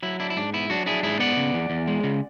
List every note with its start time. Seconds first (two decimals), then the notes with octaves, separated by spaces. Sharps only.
0.03 F#3 E4
0.20 D4 E4
0.30 E4
0.37 G#2 D4
0.54 B3 E4
0.70 F#3 D4 F#4
0.86 D4 E4 G#4
1.03 G#2 E4 G#4
1.19 B3 D5 F#5
1.37 C#3
1.54 E2
1.70 E2
1.88 G#3
2.03 C#3